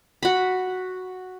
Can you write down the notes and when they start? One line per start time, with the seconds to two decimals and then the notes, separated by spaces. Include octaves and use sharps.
0.23 F#4 B5